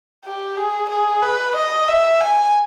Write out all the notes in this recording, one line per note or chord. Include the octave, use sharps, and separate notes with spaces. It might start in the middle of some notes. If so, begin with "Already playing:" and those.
G4
G#4
G#4
B4
D#5
E5
G#5